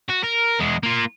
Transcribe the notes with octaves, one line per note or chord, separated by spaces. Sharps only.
F#4
A#4
E2 G#3
A#3 F4